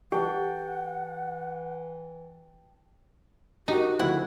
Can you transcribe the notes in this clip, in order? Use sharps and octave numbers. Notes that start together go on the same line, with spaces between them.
E3 G4 F#5 G5 A5
D#4 F#4 G4 A#4
D2 F3 C4 E4 F#5